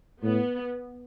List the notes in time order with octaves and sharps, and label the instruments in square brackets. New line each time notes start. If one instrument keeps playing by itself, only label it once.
[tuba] A2 [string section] B3